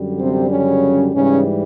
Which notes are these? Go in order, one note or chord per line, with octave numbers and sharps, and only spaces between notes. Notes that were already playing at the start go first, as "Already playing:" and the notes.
Already playing: F#2 D3 G3
C3 C4
C#3 C#4
G#2 C#3 E3 G3 C#4